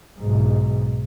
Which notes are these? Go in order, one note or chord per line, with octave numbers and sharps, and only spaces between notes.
B1 G#2